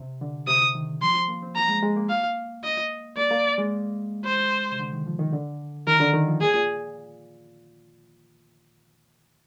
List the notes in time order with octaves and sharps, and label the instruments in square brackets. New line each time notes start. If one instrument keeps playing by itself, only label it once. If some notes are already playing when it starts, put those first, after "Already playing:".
Already playing: [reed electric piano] C3
D3
[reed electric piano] C3 [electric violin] D#6
[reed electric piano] D#3
[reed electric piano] F3 [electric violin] C6
[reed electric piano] C4
A#3
C4
[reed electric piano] A#3 [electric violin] A#5
[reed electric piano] G#3
G#3
A#3
[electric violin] F5
D#5
[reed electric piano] A#3 [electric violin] D5
[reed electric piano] A#3
G#3
[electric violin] C5
[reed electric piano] C3
D3
D#3
F3
D#3
D3
[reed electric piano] D#3 [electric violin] A#4
[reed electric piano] D3
D#3
F3
[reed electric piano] A#2 [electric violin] G#4
[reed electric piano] A#2